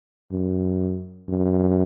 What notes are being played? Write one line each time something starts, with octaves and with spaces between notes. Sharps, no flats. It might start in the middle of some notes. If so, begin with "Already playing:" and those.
F#2
F#2